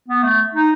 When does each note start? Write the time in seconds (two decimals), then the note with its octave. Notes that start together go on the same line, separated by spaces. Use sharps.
0.08 B3
0.24 A3
0.55 D#4